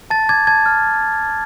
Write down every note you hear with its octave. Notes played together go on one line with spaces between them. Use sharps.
A5 A6
D6 G#6
A5 G#6
F6